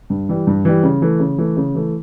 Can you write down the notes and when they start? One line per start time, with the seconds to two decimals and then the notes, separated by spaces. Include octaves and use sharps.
0.10 G2
0.29 E3 G3
0.47 G2
0.65 E3 G3
0.83 C#3
1.02 E3 A3
1.20 C#3
1.38 E3 A3
1.57 C#3
1.75 E3 A3